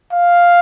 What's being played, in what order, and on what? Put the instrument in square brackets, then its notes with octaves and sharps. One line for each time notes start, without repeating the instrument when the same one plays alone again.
[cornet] F5